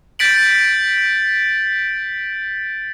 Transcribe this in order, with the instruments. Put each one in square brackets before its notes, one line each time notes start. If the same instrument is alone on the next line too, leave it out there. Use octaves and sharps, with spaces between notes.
[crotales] G6 A6 B6 D7 F#7